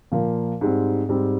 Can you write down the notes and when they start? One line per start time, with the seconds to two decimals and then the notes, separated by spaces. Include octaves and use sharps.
0.12 A#2 F3 A#3
0.61 G#2 G3 C4
1.09 G#2 G3 C4